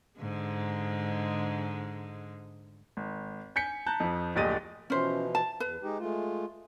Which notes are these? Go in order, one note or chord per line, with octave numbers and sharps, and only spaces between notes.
G#2 D3 G#3
G#1
G#5 G6 B6 C#7
A5 A#5 F#6 G6
F2 F3
D1 A#1 G4 D#5 A6 D#7
B2 E3 F3 C#4 C5
A5
E2 B4
G#3 D#4 G4
G#3 A3 F4